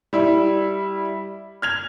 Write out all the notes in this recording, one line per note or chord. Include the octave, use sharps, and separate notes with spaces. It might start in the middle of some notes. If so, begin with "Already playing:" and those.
G3 E4
F6 G#6 F7